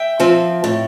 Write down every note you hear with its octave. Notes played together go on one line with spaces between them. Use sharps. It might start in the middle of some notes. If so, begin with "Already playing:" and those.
Already playing: E5 G5
F3 C4
A2